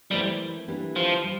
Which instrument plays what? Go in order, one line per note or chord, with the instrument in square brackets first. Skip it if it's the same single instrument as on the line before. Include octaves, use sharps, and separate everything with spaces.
[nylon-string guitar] E3 A3 C4 E4 A#4 [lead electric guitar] G3
[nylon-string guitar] E3 A#3 D4 G4
[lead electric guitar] F3
[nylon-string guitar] G3